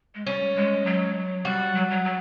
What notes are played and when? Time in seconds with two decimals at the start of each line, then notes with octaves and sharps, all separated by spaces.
0.15 G#3
0.26 G3 C#4
0.56 G#3
0.86 F#3
1.45 G3 F#4
1.75 F#3
1.91 F#3
2.05 F#3